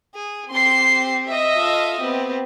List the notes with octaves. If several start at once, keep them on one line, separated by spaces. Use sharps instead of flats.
G#4
C4 G4 C6 C7
D#5 E5
F4 A4 F5
B3 C4 G4